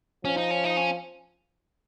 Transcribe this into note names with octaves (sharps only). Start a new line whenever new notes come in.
F3 C#4
D#4
C#4
D#4
C#4